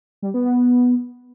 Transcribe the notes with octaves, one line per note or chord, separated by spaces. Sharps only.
G3
B3
B3